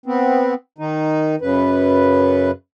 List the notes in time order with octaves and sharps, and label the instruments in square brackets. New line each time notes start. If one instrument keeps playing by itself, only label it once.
[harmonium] B3 C4
D#3 D#4
F#2 C#3 B4